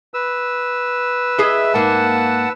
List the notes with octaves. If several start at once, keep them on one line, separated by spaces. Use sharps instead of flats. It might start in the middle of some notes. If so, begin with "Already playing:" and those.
B4 E6
E4 G#4 D#5 E5
G#2 A#3 F#5 A5